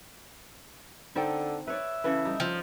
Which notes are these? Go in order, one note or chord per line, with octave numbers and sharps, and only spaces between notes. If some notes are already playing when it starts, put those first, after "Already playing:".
D3 C4 D#4 A4 C5 G5
B4 C#5 D5 E5
C#3 E3 A4 B4
G3 D#4
F3